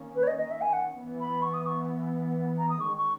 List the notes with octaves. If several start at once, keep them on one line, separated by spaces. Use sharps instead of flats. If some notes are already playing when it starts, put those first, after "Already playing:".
Already playing: D#3 A#3 C#4
B4
C#5
D#5
D#5
E5
G#5
F#5
E3 B3
B5
C#6
D#6
C#6
A#5
D#6
D#3 G#3 C#4 C#6
C#6